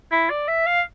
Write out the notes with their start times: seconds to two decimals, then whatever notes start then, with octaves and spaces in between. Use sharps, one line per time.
0.12 E4
0.30 D5
0.48 E5
0.66 F5